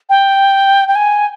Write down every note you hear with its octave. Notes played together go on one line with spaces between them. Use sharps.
G5
G5
G#5